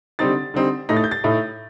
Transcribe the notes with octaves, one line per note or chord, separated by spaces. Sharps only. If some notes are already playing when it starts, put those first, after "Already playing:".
D3 G3 C4 D#4 A6
D3 G3 C4 D#4
A2 A3 D#4 A#6
A6
G6
A6
A2 A3 D#4